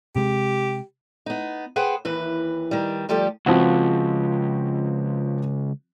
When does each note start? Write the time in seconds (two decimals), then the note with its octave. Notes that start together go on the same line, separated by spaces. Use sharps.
0.16 C3 G#3 G4
1.26 B3 D#4
1.76 G#4 B4 C5 F#5 G5
2.05 D#2 E3 B4
2.71 D#3 G3
3.09 D2 F3 G3 G4 A4 D5
3.46 C#2 F3 C4 F#4